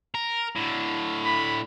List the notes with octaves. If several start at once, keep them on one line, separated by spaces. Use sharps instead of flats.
A#4
A2 D3
B5